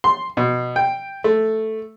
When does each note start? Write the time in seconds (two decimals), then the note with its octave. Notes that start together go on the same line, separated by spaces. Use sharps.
0.04 C6
0.37 B2
0.76 G5
1.24 A3